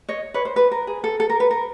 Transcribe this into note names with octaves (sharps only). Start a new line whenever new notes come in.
C#5 D#5
B4 C#5
C5
B4
A#4
G#4
A4
A4
A#4
B4
A#4